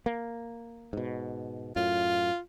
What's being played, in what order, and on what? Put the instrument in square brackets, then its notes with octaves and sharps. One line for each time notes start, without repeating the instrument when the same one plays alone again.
[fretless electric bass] A#3
G#2 B2
[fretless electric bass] F#2 A2 [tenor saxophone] F4